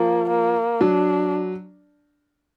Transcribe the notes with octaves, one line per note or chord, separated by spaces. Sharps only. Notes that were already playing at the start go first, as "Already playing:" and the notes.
Already playing: F3 A#3
A#3
F#3 D4